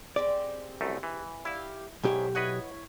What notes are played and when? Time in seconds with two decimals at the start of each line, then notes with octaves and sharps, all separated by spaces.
0.16 G3 G#3 C4 D5
0.81 C2 F#2 A3
1.03 E3
1.45 E4 G4 F5
2.04 B1 G#2 E4 G4 C5 C#5
2.35 E4 B4 C#5 D#5 F#5